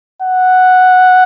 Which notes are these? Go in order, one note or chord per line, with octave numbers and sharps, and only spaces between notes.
F#5